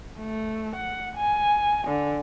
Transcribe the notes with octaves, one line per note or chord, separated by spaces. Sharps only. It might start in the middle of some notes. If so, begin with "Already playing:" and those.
A3
F#5
G#5
D3